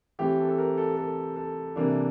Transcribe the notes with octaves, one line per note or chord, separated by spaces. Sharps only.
E3 A3 C4 E4 G4
A4
A4
A#4
A4
A4
A4
C3 E3 A#3 D4